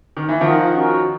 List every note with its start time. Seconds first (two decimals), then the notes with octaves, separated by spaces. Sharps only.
0.17 D#3
0.28 E3
0.41 D#3 F3 F4 A#4 D#5 F#5
0.72 C#4 F#4 A#4